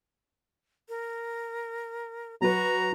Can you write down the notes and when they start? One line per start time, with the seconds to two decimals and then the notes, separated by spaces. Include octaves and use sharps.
0.89 A#4
2.42 F#3 F#4 B4 A#5